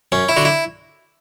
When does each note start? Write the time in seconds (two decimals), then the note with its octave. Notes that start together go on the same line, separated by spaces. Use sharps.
0.12 F#2 C#4
0.29 E4
0.37 D3 F#4
0.45 E4